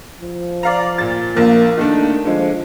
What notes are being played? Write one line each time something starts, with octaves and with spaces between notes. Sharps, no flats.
F3
D5 F5 A#5
A#2 A6
A#1 A#3
D#3 A3 A#3 D4
D3 F3 G#3